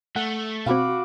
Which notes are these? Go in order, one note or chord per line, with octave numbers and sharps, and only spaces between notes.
A3 F#5
B2 C4 F#4 F5 B5 D6